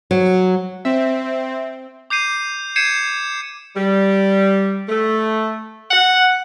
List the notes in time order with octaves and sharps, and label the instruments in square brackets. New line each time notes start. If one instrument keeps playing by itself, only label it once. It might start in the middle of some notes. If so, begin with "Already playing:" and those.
[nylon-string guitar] F#3
[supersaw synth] C4 [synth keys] E5
[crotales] D6 G6 C7 D#7
G6 G#6 C7 C#7 D#7 E7
[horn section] G3
A3
F#5